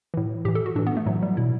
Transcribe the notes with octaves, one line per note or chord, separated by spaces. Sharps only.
A2 E3
A2 E3 G4
A4
F#4
A2 E3 D4
B3
A3
A2 E3 F#3
G3
B2 E4